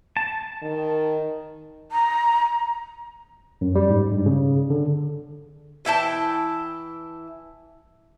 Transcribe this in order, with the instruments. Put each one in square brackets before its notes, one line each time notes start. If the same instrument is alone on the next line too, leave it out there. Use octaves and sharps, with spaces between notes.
[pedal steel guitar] A5
[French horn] D#3
[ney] A#5
[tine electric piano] F#2
G3
G#2
G2
C#3
D3
[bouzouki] E3 E4 G5 A5